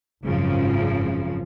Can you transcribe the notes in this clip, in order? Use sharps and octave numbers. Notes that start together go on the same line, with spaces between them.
G#1 F#2 C#3 F3